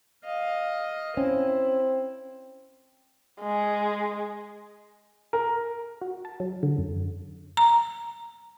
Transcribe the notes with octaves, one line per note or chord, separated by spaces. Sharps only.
D#5 F5
C4 C#4 E4
G#3
A#4
F#4
A5
F#3
D3
F#2
A#5